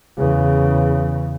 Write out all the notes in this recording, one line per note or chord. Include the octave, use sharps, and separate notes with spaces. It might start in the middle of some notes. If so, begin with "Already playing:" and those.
E2 C#3